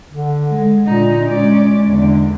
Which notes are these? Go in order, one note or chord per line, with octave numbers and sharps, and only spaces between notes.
D3
G#3
A#2 D3 D#4
G#3 C#4 D5
E2 D3